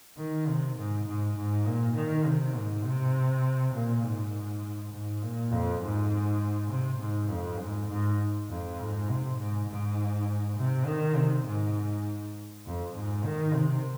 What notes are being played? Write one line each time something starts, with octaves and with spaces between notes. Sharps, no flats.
D#3
C3
G#2
G#2
G#2
A#2
D#3
C3
G#2
C3
A#2
G#2
G#2
A#2
F2
G#2
C3
G#2
F2
G#2
G#2
F2
G#2
C3
G#2
G#2
C3
D#3
C3
G#2
F2
G#2
D#3
C3